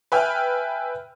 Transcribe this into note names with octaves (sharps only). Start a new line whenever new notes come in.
B4 E5 G5 G#5 F6